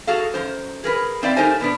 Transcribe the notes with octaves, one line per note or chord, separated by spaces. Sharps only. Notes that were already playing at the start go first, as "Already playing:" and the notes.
F#4 G#4 A4 F5
F#2 C5
G#4 A#4 B4
G#2 C4 D5 E5 F5
A3 D#4 G4 A#4 C5 G#5
B2 B3 D4